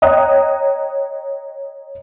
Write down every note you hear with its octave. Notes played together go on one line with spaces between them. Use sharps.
C#5 D#5 G5 A#5 D#6 F#6